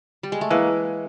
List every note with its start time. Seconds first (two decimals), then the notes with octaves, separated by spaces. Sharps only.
0.23 G3
0.32 G#3
0.41 A3
0.50 E3 G#3 A#3